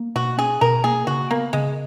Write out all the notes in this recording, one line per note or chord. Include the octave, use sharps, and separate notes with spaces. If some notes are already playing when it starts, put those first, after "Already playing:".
Already playing: A#3
B2 F#4
C#4 G#4
B2 A#4
A#3 G#4
C#3 F#4
A#3 B3
C#3 G#3